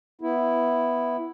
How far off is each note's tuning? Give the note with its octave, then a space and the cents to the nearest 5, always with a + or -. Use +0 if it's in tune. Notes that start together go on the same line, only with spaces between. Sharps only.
B3 +0 E4 +0